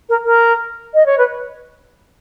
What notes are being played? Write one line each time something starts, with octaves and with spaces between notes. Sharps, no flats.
A#4
A#4
D#5
C#5
B4